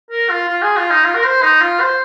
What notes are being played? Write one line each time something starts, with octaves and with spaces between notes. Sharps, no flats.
A#4
F4
F4
G#4
F4
D#4
F4
A#4
C5
D#4
F4
C5